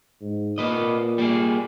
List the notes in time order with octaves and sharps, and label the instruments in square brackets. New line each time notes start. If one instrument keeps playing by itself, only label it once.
[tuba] G#2
[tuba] A#2 [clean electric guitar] A#3 B4 D#5
[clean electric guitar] G3 A#3 G#4